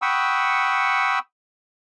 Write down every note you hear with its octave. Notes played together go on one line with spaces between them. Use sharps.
F#5 G5 B5 C#6 D#6 E6